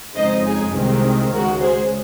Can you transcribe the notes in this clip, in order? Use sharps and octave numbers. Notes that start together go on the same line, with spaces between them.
F2 C#3 G#3 D#4 C5 D#5
G#4
C2 C3 D#3 G#3 C4
C#2 C#3 G#3 F#4 A#4
G#4 C5